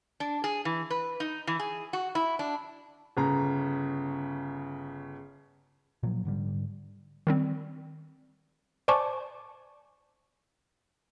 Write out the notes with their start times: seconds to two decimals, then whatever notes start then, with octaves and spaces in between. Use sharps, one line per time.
0.20 D4
0.44 G#4
0.65 E3
0.90 B4
1.20 D#4
1.47 E3
1.59 G#4
1.93 F#4
2.15 E4
2.39 D4
3.17 G1 C#3 A#5
6.03 A#2 F3 F#3
6.25 G#2 D3 G3
7.27 D#3 G3 C4
8.88 C5 D5 G#5 A5 C#6 D6